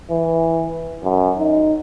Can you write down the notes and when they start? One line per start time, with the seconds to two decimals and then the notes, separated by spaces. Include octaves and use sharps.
0.11 E3
1.04 F#2
1.39 D#4